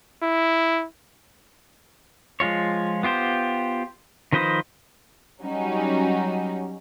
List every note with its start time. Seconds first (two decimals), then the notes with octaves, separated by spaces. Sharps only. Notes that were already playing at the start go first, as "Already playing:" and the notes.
0.22 E4
2.40 F3 G#3 F4 C#5
3.03 B3 F4 G4 C5
4.33 D#3 F3 B4 C5 D#5
5.43 F#3 G3 C#4 D#4 F#4